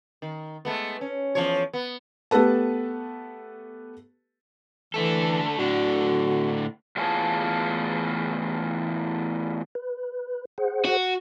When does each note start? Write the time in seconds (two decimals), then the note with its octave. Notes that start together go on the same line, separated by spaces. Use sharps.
0.22 D#3
0.65 G#3 A3 B3
1.01 C#4
1.35 E2 F3 C#5
1.73 B3
2.31 A3 B3 G4 A4 B4 A5
4.94 D3 E3 A3 A4
5.59 A2 D3 D4 F#4
6.97 E2 A2 F4 G#4 C#5 A5
9.75 B4
10.58 G#4 C5 F#5
10.85 F#4